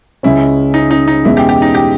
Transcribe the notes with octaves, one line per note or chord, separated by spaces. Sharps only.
C#2 C#3 G#3 C#4 E4
D#4
D#4
D#4
E2 B2 G#3 C#4 E4
G4
G4
D#4
G4